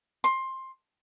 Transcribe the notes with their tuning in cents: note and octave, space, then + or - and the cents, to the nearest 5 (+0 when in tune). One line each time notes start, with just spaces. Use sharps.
C6 +15